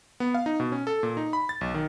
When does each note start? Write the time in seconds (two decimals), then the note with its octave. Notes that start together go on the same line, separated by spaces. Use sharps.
0.20 B3
0.34 F5
0.46 D#4
0.60 B2
0.72 C#4
0.87 A4
1.03 A#2
1.17 D#4
1.33 B5
1.49 A6
1.61 B1
1.74 D#3